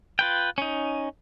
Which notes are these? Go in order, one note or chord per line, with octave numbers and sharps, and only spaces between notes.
F4 B4 G5
C#4 D#4